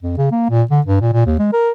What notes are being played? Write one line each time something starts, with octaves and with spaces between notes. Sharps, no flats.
F2
C#3
A#3
A#2
D3
G2
A#2
A#2
D#2
G#3
A#4